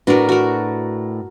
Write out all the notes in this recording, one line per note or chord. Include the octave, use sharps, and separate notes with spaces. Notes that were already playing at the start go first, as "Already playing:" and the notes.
A2 D4 F#4 A#4 B4
F#4 A#4